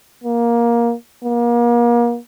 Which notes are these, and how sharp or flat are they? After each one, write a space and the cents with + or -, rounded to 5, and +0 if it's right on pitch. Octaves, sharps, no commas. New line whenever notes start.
A#3 +15
A#3 +35